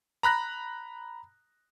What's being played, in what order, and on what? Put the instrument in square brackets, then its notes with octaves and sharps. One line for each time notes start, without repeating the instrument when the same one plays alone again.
[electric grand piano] A#5 B5 F#6 A#6